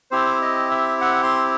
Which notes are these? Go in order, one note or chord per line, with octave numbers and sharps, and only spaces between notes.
C4 E4 G4 C5
D#5
E5
F#5
C6